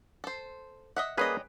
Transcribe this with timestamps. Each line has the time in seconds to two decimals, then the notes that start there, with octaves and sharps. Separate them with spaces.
0.24 A4 C5
0.96 D#5 E5 F#5
1.17 G3 A#3 C#4 G#4 B4 D#5